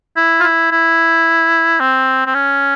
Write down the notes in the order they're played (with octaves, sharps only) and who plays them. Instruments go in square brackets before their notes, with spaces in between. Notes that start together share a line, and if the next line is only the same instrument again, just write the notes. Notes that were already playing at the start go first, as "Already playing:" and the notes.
[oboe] E4
F4
E4
E4
C4
C4
C#4